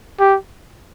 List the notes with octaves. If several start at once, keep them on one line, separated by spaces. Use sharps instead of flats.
G4